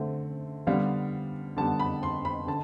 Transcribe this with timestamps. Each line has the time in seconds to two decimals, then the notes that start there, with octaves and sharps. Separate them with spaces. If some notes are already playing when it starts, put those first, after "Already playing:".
Already playing: D3 A3 C4
0.67 D3 G3 B3 F5
1.57 D3 G3 B3 A5
1.80 B5
2.03 C6
2.25 B5
2.47 D3 A5